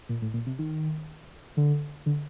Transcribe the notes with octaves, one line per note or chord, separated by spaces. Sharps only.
A#2
A2
A#2
C3
D#3
D3
D3